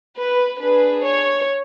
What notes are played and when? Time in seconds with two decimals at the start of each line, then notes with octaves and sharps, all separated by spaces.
0.18 B4
0.60 D4 G#4 B4
1.05 C#5